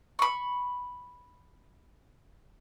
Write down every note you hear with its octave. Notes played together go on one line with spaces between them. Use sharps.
B5 C#6